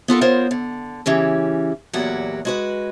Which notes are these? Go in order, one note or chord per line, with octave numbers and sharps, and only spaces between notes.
B3 F4 A4 A#4
B3 F4 A#4 C5 C#5
D3
C#3 E3 C#4 G4
E2 A#2 F#3 F#4 G4 F#5
G#3 F#4 B4